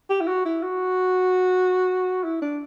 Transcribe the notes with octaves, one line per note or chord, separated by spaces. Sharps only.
G4
E4
F#4
E4
F#4
E4
D4